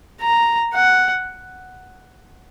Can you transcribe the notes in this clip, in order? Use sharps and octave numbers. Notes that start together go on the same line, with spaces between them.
A#5
F#5